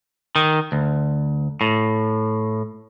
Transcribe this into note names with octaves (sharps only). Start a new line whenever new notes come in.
D#3
D2
A2